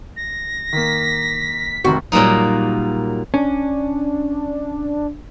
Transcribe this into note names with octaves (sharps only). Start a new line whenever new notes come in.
A#6
D#3 A#3 B6
F1 D#3 C4 F#4
A#2 F#3 G3 A#3 D#4
C#4 D4